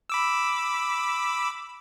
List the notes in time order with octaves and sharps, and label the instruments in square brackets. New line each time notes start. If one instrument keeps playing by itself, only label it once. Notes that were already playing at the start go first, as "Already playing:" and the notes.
[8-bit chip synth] B5 D6 E6